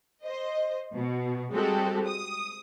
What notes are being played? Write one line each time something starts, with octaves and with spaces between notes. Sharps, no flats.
C5 D#5
B2
G3 G#3 C4 F#4 G4 A4
D#6